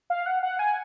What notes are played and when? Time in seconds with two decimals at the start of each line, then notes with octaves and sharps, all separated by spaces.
0.10 F5
0.26 F#5
0.43 F#5
0.59 G#5